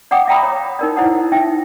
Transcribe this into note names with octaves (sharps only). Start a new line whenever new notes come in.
D5 F#5 G5 D6 D#6
E5 F5 G5 A#5 B5 D#6
C#5
D#4 A#4 D5
E4 C5 F#5 D#6
D#4 E5 G5